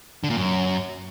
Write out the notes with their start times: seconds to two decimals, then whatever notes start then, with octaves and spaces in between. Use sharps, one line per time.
0.24 D3
0.30 A#2
0.37 F#2